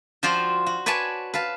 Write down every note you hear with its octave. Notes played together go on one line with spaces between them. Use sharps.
F3 F4 F#4 C5 D5 G5
F#4
B4 C#5 D5 G#5 A5
B4 F5 A5